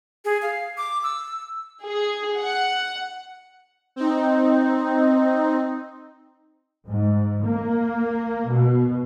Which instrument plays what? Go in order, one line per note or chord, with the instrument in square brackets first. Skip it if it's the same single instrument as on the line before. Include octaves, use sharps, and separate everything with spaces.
[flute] G#4
F5
D6
E6
[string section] G#4
F#5
[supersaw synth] C4 D#4
[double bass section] G#2
A#3
B2